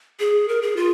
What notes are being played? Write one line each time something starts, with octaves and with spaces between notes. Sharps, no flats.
G#4
A#4
G#4
F4